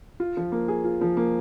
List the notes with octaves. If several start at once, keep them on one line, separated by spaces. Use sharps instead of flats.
F4
F3
A#3
G#4
F4
F3
A#3